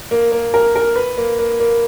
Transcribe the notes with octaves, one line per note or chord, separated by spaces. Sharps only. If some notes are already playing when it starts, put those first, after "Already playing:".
A#3
A#3
A#4
A#4
B4
A#3
A#3
A#3